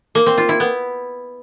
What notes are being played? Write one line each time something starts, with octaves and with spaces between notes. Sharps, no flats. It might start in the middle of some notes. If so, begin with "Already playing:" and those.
A#3
C4
F4
E4
B3